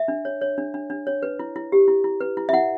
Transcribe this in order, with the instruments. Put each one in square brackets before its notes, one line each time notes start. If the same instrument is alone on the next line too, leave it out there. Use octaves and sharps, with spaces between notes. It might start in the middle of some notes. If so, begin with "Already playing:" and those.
Already playing: [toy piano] E5
D4
C#5
C#5
D4
D4
D4
C#5
B4
E4
E4
G4
E4
E4
B4
E4
E5
E4 F#5